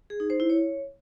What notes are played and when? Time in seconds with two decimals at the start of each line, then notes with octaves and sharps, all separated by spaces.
0.10 G#4
0.20 D#4
0.30 C5
0.40 E4
0.50 C#5